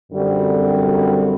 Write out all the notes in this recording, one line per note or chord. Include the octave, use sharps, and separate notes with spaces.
F#2 D3 G3 C4 F#4